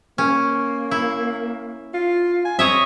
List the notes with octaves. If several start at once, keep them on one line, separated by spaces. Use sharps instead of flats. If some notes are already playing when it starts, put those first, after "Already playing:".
A#3 C#4
E4
F4
G#5
C4 C#5 D#5 E5